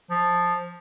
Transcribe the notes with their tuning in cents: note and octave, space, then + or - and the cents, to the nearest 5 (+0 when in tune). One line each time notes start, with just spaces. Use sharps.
F3 +10